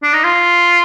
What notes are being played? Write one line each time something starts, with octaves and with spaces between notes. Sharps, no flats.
D4
D#4
F4